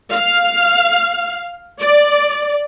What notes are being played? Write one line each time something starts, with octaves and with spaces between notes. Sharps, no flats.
F5
D5